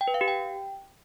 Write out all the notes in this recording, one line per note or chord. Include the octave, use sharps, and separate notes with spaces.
G5
B4
F5
G4
G5